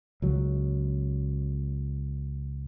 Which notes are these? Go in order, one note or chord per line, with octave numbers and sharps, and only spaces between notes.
C#2 F#3